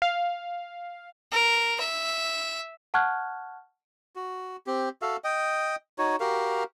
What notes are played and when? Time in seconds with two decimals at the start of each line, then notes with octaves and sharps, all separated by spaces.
0.02 F5
1.32 A#4
1.80 E5
2.94 F#5 A5 C#6 F6 F#6 G#6
4.16 F#4
4.67 C4 G4
5.02 F#4 A4 E5 F5
5.24 D#5 G5
5.98 D#4 F#4 C#5
6.20 F#4 G4 A#4 F5